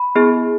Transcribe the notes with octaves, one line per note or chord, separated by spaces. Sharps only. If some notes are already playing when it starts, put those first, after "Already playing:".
Already playing: B5
B3 E4 G#4